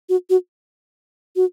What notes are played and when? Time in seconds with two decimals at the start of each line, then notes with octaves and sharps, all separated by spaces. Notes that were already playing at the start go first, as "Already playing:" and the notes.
0.09 F#4
0.30 F#4
1.36 F#4